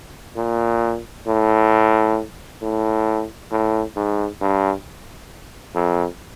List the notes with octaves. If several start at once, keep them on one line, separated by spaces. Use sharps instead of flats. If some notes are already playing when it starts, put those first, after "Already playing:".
A#2
A2
A2
A2
G#2
G2
F2